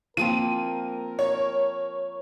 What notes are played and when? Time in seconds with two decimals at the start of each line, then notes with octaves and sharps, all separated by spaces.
0.17 F3 A#3 C4 A#4 D#7
1.19 C#5